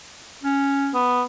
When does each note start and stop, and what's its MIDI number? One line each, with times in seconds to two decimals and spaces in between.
0.43 0.94 61
0.94 1.23 59